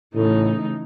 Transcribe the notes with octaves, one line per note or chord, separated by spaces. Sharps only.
A2 C#3 E3 A3 D#4